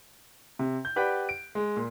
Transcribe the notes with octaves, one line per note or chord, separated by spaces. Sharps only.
C3
G6
G4 B4 D5 F#5 G5
D7
G#3
A#2